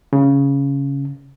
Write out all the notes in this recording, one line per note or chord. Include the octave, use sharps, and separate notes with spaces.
C#3